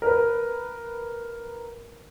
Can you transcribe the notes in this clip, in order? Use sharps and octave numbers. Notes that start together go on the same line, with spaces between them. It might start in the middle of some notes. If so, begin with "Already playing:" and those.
A#4 B4